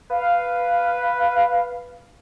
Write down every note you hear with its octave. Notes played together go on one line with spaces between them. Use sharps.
B4 F5